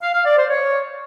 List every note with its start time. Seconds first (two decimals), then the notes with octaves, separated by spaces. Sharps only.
0.02 F5
0.14 F5
0.26 D5
0.37 C5
0.49 C#5